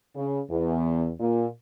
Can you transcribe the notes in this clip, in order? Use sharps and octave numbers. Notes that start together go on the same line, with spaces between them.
C#3
E2
A#2